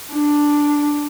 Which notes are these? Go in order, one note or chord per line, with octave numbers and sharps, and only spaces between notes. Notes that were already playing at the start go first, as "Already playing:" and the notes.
D4